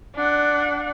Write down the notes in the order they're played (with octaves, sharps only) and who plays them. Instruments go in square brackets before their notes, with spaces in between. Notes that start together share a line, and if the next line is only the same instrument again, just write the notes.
[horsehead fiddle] D4 F#5